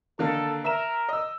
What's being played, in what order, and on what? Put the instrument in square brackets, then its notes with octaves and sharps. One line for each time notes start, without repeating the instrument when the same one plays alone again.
[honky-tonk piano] D3 D#3 A#3 [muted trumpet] A4
[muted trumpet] A#4 [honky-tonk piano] E5 A#5 E7
[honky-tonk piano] D#5 E6